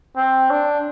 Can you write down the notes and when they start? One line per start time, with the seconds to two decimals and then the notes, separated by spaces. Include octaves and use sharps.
0.16 C4
0.50 D4